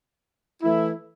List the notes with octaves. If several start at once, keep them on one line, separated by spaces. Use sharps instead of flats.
E3 A3 E4